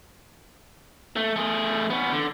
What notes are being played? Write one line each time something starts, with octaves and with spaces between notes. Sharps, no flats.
A3
A3 G#4
B3 C#4
D3